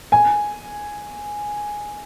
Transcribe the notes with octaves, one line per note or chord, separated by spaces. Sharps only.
G#5